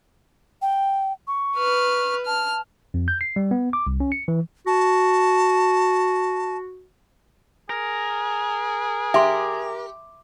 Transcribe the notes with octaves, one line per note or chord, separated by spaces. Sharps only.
G5
C#6
B4 F6
A5 F6
F2
G6
C7
G3
B3
D6
C2
C#4
C#7
E3
F#4 A5
G#4 A#4
G4 E5 C6